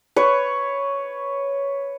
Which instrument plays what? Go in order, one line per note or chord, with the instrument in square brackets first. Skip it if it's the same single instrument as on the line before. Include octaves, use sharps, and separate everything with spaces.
[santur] B4 C#5